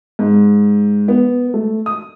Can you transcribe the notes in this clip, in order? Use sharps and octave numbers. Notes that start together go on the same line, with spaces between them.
G#2
B3
A3
D#6